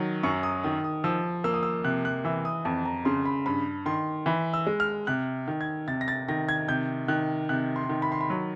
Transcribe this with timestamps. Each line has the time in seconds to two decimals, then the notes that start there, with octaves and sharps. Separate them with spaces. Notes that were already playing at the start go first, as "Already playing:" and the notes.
Already playing: D#3 F#3
0.23 F#2 C#6
0.43 D#6
0.63 D#3 D#6
0.84 D#6
1.04 F3 E6
1.44 A#3 E6
1.54 D#6
1.63 E6
1.84 C3 F#6
2.05 F#6
2.25 E3 E6
2.45 D#6
2.65 F2 A5
2.86 A#5
3.05 C#3 C6
3.25 B5
3.46 G2 B5
3.86 D#3 C6
4.26 E3 B5
4.54 E6
4.67 G#3
4.80 F6
5.07 C3 F#6
5.48 D#3
5.61 G#6
5.88 C3 A6
6.01 A#6
6.08 A6
6.28 D#3 A#6
6.49 G#6
6.68 C3 G6
7.08 D#3 F#6
7.49 C3 F#6
7.76 C6
7.89 D#3
8.02 B5
8.12 C6
8.21 B5
8.30 F#3